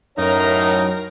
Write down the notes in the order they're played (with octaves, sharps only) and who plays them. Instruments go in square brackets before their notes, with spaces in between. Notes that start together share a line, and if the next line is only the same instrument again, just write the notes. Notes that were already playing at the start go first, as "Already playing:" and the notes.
[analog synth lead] F#2 [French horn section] A2 C#5 [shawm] D#4 [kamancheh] A#4 A#5